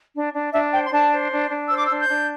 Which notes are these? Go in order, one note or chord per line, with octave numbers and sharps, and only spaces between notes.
D4
D4
D4 E5
C5 G5
C6
D4 A5
C5
D4
D4
C5 E6
D6
E6
D4
G6
D4